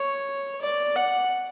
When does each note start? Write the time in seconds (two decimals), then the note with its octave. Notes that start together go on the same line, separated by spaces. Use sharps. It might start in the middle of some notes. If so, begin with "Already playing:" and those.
Already playing: C#5
0.62 D5
0.96 F#5